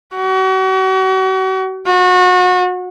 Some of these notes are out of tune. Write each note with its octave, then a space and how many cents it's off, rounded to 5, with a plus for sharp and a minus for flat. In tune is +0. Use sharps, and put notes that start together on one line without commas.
F#4 +40
F#4 -30